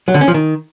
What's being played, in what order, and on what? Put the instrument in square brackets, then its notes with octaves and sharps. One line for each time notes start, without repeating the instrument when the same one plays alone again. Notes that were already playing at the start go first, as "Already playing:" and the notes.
[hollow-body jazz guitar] F#3
D3
C#4
F3
D#3